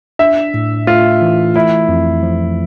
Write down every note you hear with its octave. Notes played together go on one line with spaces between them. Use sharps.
D4 E5
A2
A3 F4
E3
A3 E4
F2
F3